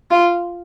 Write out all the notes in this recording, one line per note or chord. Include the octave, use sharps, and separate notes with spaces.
F4